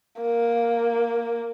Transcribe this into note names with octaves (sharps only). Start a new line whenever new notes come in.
A#3